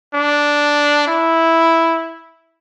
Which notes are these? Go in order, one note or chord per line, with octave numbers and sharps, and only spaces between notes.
D4
E4